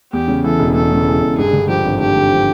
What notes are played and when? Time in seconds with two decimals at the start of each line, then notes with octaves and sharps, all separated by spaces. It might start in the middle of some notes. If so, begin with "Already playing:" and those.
0.12 E2 G4
0.28 C#3
0.44 E3 A4
0.59 E1
0.75 E2 A4
0.91 C#3
1.07 E3
1.22 E1
1.37 G2 G#4
1.53 D3
1.68 F3 G4
1.84 G#1
2.00 G2 G4
2.16 D3
2.31 F3